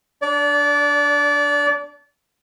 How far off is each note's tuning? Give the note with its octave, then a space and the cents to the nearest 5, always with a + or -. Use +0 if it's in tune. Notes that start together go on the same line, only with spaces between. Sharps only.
D4 -5 D5 -25